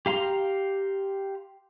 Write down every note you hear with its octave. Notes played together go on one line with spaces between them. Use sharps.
G4 F5 A#5 C6